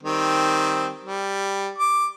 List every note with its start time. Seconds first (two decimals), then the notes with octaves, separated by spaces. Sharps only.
0.03 D#3 G3 C4
1.04 G3
1.78 D6